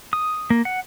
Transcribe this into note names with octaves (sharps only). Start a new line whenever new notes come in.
D#6
A#3
F#5